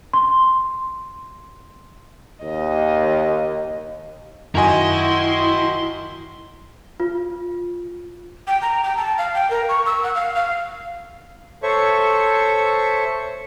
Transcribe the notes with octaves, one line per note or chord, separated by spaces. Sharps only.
C6
D#2 D#5
F#2 D#3 E4 F#4 D#5 G#5 A#5 C6
F4
G5
A#5
G5
A5
F5
G5
A#4
C#6
E6
F#5
F5
F5
A4 C5 C#5 E5 C#6